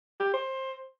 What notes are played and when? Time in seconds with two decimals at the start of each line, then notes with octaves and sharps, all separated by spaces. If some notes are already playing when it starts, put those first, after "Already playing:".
0.20 G4
0.34 C5